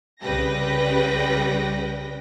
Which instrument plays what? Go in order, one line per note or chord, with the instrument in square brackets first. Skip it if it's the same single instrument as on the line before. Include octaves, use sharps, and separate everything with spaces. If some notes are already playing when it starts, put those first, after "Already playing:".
[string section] C2 C#3 G3 B4 G5 A#6